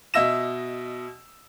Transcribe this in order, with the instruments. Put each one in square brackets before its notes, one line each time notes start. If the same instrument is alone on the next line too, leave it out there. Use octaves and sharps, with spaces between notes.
[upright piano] B2 D#5 E5 E6 A#6 E7